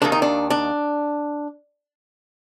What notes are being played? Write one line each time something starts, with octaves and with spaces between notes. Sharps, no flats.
D#2 D#3 A#3 D4
D#4
D4
D4